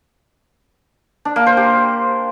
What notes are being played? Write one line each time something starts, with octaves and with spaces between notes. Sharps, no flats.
D4
A#3
C5
G4